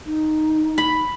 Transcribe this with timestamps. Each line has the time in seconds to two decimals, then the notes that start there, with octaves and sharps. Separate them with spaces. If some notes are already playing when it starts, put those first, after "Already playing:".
0.05 D#4
0.78 B5